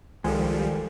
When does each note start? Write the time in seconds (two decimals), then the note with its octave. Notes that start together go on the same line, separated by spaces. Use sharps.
0.24 C2 D#3 F3 G3 G#3 A4 A#4